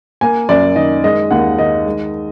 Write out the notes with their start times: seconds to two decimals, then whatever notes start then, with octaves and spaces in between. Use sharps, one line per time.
0.21 A#3 G#5
0.49 F#2 D5
0.76 D#3 D#5
1.04 G#3 D#5
1.31 D#2 F#5
1.58 D#3 D#5
1.86 G#3